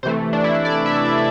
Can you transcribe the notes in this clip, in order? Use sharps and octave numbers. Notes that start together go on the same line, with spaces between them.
C3 E3 A3 C5
D4
E4
D5
E5